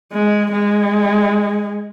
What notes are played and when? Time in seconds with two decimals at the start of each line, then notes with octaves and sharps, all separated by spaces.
0.13 G#3
0.52 G#3